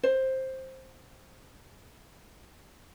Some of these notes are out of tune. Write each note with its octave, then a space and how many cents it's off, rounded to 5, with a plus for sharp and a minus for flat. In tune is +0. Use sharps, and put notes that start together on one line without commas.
C5 +10